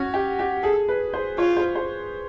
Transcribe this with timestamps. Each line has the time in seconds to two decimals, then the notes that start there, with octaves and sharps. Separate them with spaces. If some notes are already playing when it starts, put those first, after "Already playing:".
Already playing: C#4 F#4
0.14 G4
0.39 G4
0.63 G#4 A4
0.88 B4
1.13 C5
1.38 F4 C#5
1.57 C5
1.75 C5